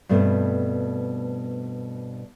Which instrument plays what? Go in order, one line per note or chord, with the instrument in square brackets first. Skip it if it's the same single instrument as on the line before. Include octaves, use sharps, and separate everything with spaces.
[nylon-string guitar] G2 B2 A3 B3 C4